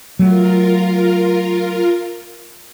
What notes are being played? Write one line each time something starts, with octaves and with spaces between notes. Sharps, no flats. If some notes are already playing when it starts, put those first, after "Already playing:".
F#3 A3 F4 A#4